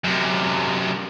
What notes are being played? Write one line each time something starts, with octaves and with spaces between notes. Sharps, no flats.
F#2 C3